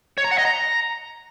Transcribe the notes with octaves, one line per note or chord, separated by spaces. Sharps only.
C#5
A#5
F#5
D#5
A#5